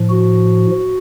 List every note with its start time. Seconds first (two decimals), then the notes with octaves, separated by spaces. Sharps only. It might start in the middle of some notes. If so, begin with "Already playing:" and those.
Already playing: A2 F3
0.10 F#4